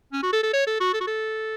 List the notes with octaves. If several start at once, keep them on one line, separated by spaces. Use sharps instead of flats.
C#4
F#4
A4
A4
C#5
A4
F#4
A4
F#4
A4